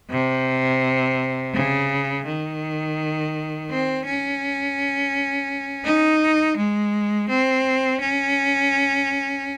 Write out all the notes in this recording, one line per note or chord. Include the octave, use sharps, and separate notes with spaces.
C3
C#3
D#3
C4
C#4
D#4
G#3
C4
C#4